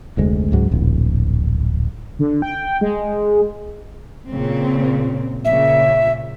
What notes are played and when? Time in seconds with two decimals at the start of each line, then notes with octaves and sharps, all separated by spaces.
0.17 F1 D2 G#3
0.52 C#2 G#2 F#3
0.71 D1 A#1
2.19 D3
2.42 G5
2.81 G#3
4.30 A#2 C#3 C4
5.45 A#2 C#3 E5